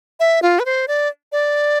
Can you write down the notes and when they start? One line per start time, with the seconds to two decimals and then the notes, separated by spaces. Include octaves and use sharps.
0.20 E5
0.42 F4
0.59 B4
0.66 C5
0.88 D5
1.32 D5